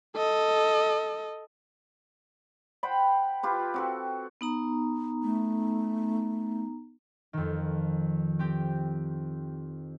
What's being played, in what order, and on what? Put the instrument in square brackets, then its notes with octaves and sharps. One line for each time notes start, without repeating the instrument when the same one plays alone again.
[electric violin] A4 D#5
[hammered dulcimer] C5 F#5 G5 B5
F4 G4 B4
C4 F#4 A4
[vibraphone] B3 D#4 A#5
[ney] A3
[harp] F2 D#3
C4 G4